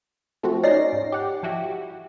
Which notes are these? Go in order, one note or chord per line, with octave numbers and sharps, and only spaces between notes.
F3 A3 C4 F#4
C#4 D#4 D5 A#6 C7
G#2
G4 F#5
F3 E4 F#4 G4